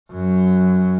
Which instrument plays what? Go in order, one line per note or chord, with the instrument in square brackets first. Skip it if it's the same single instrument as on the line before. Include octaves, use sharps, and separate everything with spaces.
[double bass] F#2 F#3